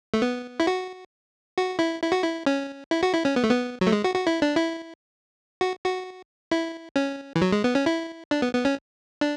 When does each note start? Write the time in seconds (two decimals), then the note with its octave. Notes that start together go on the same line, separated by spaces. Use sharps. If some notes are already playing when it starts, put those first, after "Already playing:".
0.14 A3
0.22 B3
0.60 E4
0.67 F#4
1.57 F#4
1.79 E4
2.02 E4
2.12 F#4
2.23 E4
2.46 C#4
2.91 E4
3.03 F#4
3.14 E4
3.25 C#4
3.36 B3
3.44 A3
3.50 B3
3.81 F#3
3.87 A3
3.92 G#3
4.04 F#4
4.15 F#4
4.27 E4
4.42 D4
4.56 E4
5.61 F#4
5.84 F#4
6.51 E4
6.96 C#4
7.36 E3
7.42 F#3
7.52 G#3
7.64 B3
7.75 C#4
7.86 E4
8.31 D4
8.42 B3
8.53 B3
8.65 C#4
9.21 D4